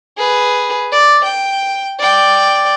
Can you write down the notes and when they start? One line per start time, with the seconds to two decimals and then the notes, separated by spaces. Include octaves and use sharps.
0.18 G#4 B4
0.92 D5
1.25 G5
1.99 D5 G5